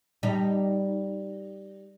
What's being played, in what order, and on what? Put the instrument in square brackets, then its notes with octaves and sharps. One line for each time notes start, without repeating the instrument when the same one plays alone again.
[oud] G3 D#4